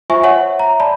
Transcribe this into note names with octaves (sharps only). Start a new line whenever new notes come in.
F4 C5 E5 G#5 C#6
C#5 E5 F#5
A#5
D5 A5 B5